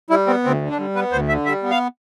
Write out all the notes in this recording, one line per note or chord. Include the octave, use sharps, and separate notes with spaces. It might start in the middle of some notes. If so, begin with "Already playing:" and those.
G3 E4
B3 C4
D2 C4
D3
D4
G3
B3 B4
D2 C5
D3 E5
G3 E5
B3
F5